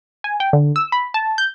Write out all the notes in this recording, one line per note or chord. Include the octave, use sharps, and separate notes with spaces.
G#5
G5
D3
E6
B5
A5
G6